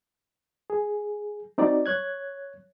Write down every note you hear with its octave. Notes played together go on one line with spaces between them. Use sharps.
G#4
C4 D#4 F#4 D5
C#5 F#6 G#6